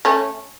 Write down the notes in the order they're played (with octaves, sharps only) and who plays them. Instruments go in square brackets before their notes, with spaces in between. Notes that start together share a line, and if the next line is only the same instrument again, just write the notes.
[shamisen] A3 C#4